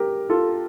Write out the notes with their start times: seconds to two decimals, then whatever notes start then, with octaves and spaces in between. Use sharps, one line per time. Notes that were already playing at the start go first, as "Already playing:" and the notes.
Already playing: G4 A#4
0.30 F4 A4